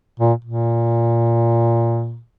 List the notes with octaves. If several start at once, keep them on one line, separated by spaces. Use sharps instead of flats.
A#2
A#2